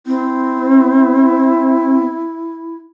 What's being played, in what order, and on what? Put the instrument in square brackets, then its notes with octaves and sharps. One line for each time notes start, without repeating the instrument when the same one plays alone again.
[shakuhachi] C4 [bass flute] E4